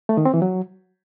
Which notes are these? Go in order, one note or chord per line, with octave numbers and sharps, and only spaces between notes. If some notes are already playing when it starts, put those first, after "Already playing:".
A3
D#3
C4
E3
F#3